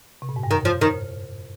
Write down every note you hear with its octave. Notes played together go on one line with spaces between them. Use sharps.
C3
A#2
G#2
G2
F2 D#3
F3
D#3